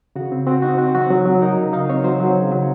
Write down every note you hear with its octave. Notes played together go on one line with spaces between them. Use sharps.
C#3 F#4
C4
C4 F#4
D#4 F#4
C4 F#4
F#3 F#4
F#3
F#3
D#4 A#4
C#3
D#4 F5
C4 C#5
F#3 C5
F#3
C#3
F#3